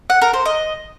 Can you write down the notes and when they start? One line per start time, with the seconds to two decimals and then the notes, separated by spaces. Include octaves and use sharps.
0.10 F#5
0.22 A#4
0.34 C5
0.45 D#5